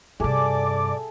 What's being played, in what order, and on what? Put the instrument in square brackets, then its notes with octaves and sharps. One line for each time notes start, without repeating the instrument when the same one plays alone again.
[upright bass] G2 C3 [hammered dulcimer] G#4 A4 E5 [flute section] D5 D6